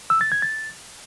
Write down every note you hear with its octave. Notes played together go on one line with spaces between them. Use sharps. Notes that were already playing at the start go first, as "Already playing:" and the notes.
E6
A6
G#6
A6